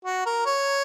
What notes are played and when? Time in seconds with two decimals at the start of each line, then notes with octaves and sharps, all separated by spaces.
0.05 F#4
0.26 A#4
0.46 C#5